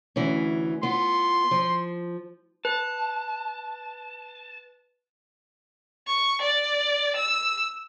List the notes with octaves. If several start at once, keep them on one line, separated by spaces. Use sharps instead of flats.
D2 E3 C#4
B3 F4 C6
F3
B4 A5
C#6
D5
E6